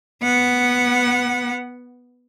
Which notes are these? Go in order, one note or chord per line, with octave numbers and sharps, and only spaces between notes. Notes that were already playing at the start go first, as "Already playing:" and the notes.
B3 F#5